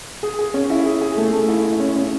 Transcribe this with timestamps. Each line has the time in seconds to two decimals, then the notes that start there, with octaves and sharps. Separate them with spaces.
0.23 G#4
0.39 G#4
0.54 C#4
0.70 E4
0.86 G#4
1.01 G#4
1.17 A3
1.33 A3
1.48 E4
1.64 E4
1.80 C#4
1.96 C#4